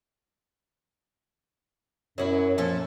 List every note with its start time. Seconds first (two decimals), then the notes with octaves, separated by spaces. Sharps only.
2.18 F#2 F#3 C#4 E4
2.58 A#2 F3 C#4 A4